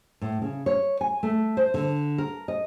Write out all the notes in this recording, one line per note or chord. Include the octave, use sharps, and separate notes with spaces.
A2
C#3
C#5
G#5
A3
C5
D3
A#4
D#5